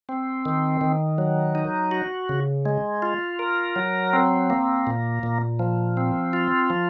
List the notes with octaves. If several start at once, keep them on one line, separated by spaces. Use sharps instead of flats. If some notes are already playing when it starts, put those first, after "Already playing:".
C4
D#3
D#3
F#3
D#4
F#4
C#3
G#3
F4
A#4
F#3
C4
A#3
A#2
A#2
F3
C4
F4
F3